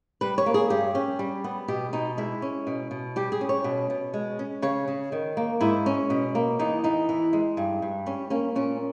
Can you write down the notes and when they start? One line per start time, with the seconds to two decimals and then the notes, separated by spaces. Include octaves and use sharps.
0.21 G3 B4
0.38 C#5
0.46 A#3
0.54 G#4
0.70 G2 G4
0.95 C#4
1.19 G3
1.44 B3
1.68 B2 G4
1.93 B2 D#4
2.17 G#3 E4
2.42 C#4
2.67 B2
2.91 B2
3.16 G3 G4
3.32 G#4
3.41 C#4
3.49 C#5
3.64 B2
3.90 B2
4.14 G#3
4.39 C#4
4.62 C#3 C#5
4.88 C#3
5.12 D#3
5.37 A#3
5.60 G#2 E4
5.86 C#4
6.10 B2
6.35 A#3
6.59 E2 D#4
6.84 E2 D#4
7.09 E3
7.33 G#3
7.57 G2
7.82 G2
8.06 G3 C#4
8.30 A#3 C#4
8.55 A#2 C#4